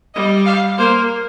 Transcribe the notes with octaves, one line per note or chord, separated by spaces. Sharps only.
G3 D#5
F5
A#3 C5